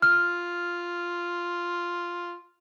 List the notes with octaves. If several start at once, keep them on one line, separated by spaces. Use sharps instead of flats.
F4 F6